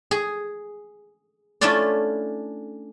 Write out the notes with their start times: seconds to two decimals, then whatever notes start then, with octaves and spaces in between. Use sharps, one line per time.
0.11 G#4
1.61 A3 C#4 D4 E4 F4 D5